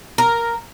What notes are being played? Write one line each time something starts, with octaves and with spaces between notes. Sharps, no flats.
A#4